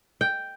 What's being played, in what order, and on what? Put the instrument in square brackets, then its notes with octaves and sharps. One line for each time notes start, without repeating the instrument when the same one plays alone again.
[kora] G5